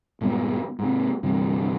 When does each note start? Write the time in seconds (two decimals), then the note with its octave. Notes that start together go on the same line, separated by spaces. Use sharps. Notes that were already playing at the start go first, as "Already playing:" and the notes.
0.21 G1 A#2 G#3 B3
0.79 G#2 C3
1.23 D2 G2 C3 E3